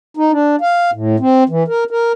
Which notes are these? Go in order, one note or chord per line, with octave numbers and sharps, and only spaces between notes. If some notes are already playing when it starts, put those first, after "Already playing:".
D#4
D4
F5
A2
C4
E3
A#4
A#4